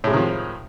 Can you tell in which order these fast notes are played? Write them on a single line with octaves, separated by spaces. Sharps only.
A2 G#3 C3 D#3 F3